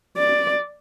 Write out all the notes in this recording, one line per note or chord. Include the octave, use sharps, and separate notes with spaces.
D5